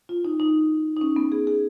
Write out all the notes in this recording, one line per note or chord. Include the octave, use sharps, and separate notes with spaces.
F4
D#4
D#4
D#4
C#4
B3
G#4
G#4